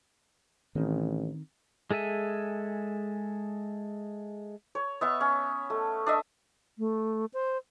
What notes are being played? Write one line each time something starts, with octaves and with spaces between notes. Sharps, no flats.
A1 D#3 C4
G#3 G#4 A4 E5 G#5
C#5
B3 E5 C#6
C#4
A3
D4 D#5 E5
A3
C5